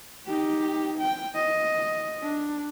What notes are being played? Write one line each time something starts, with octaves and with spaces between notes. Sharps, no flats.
D#4 G4
G5
D#5
D4